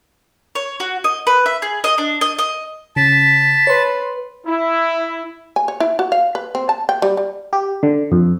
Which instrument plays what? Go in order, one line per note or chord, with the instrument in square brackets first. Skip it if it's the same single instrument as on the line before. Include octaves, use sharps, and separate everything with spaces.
[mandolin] C#5
F#4
D#5
B4
E5
G#4
D#5
D4
D#5
D#5
[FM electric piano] C#3 [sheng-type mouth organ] A5 [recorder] B6
[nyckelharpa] B4 [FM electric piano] C#5 C6
[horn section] E4
[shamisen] G#5
C#5
E4
F#4
F5
B4
C4
A5
G5
G3
G3
[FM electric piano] G4
D3
F2